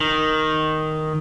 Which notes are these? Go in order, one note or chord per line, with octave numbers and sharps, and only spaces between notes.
D#3